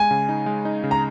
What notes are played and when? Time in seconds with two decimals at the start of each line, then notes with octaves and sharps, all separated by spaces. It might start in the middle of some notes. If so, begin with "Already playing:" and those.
Already playing: G#3 G#5
0.11 C#3
0.29 D#4
0.46 G#3
0.65 D#4
0.84 C#3
0.91 A#5